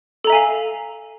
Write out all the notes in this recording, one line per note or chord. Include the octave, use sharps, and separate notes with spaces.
A4 E5 F5 G#5 A#5